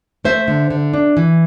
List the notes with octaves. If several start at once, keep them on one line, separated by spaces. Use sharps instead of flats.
A3 C5 E5
D3
D3
D4
E3